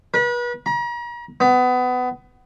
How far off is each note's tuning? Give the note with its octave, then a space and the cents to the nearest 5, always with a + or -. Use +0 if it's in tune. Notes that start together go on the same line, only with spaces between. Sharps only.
B4 -35
A#5 +40
B3 +25